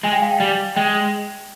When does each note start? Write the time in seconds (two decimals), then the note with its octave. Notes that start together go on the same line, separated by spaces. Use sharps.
0.03 G#3 G#5
0.12 G5
0.22 F5
0.31 G5
0.40 G3
0.76 G#3 G5